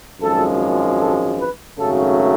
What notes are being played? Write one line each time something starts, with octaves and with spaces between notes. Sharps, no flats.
G#1 F#2 F3 G#3 A4
A4
B4
G#1 F#2 C#3 F#3 A3 A4